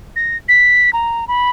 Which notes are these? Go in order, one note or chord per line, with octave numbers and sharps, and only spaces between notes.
A#6
B6
A#5
B5